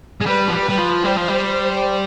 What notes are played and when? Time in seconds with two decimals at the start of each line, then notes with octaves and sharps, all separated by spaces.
0.21 G#3
0.26 G3 B4
0.48 F3
0.53 G3
0.66 G3 B4
0.79 F3
1.05 G3 C5
1.17 F3
1.28 G3